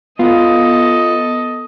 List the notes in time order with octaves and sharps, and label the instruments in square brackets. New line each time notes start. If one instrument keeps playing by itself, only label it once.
[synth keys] B3 [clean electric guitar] F4 [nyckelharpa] A4 D#5